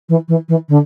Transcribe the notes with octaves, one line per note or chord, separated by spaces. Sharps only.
E3
E3
E3
D3